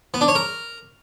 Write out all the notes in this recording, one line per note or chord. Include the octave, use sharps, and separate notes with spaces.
B3
D4
C#5
A#4